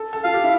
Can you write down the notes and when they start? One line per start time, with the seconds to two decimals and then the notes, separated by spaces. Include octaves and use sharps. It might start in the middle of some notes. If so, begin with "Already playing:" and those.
Already playing: A4
0.13 A4
0.24 F4 F5
0.34 G4
0.44 E4